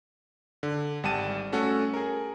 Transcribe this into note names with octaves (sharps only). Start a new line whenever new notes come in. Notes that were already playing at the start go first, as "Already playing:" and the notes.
D3
G#1 G3 F#5 A5 D#7
A3 C#4 F#4 A4
G#4 A#4